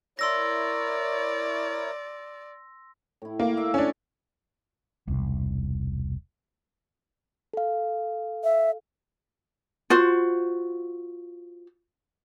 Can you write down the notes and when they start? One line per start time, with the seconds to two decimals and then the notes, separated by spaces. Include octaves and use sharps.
0.19 E4 A#4 C#5 D5 C6 E6 A#6
3.22 A2 E4
3.40 A#3
3.57 E5
3.74 C#4 D4
5.07 E1 C2
7.53 A4 F5
8.44 E5
9.90 F4 F#4 C5